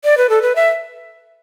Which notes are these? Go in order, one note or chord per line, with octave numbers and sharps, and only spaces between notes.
D5
B4
A4
B4
E5